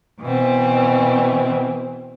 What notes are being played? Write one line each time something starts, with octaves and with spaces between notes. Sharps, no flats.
B2 E3 C4